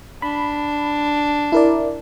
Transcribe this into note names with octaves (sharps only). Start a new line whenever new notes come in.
D4 B5
E4 A#4 D5